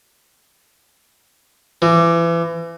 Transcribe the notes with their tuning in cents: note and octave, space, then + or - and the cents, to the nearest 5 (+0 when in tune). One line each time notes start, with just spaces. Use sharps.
E3 +30